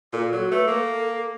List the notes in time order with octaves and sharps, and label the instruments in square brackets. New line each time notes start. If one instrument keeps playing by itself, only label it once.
[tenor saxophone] A#2 [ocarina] A4
[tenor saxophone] F#3
[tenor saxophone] A3 [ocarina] B4
[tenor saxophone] A#3 [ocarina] A4